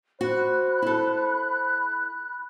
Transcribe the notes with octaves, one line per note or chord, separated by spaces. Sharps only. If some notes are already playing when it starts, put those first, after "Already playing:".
F#4 C5 B5 F#6
E4 A4